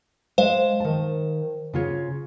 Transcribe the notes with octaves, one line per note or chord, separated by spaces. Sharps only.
G#3 C5 F5
D#3 A5
C#3 F4 C#5